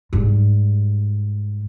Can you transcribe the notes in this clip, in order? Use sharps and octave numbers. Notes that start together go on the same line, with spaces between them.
G#2 G3